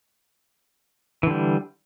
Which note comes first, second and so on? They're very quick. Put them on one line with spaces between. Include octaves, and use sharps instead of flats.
E3 D3 G3